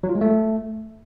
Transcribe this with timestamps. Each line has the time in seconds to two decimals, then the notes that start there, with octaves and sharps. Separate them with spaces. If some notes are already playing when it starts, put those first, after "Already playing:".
0.03 F#3
0.09 F4
0.15 G#3
0.21 A3